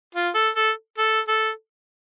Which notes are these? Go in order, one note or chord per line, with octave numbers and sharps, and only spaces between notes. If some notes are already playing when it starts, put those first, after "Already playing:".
F4
A4
A4
A4
A4